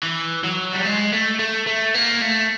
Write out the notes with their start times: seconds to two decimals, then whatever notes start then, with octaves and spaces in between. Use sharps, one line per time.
0.03 E3
0.44 F#3
0.73 G3
0.85 G#3
1.13 A3
1.39 A3
1.67 A3
1.94 A#3
2.21 A3